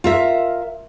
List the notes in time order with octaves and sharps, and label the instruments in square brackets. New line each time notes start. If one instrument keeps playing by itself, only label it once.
[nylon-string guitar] F4 A#4 E5